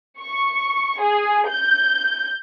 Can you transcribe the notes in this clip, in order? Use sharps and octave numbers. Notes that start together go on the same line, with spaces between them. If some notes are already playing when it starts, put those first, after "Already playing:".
C#6
G#4
G6